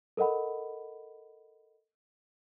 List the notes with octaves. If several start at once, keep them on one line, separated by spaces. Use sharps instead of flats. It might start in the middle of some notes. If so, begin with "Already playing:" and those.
A4 A#4 D#5 F#5 B5